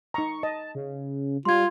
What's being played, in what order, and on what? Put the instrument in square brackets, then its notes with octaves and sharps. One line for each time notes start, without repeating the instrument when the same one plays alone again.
[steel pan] D#4 A#5 [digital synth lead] C#6
[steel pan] D#5 [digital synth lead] A5
[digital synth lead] C#3
[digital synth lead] G3 [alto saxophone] F4 [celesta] C6 G#6